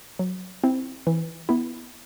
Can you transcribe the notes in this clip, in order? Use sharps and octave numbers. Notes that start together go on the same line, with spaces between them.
F#3
C4 E4
E3
B3 E4